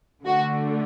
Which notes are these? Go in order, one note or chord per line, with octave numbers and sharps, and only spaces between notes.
D3 A3 D4 F#4